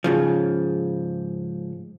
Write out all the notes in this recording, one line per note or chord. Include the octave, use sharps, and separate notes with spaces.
G#2 C#3 F3